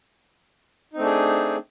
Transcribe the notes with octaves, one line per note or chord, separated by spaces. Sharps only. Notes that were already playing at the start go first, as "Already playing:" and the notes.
A3 C4 D4 D#4 G#4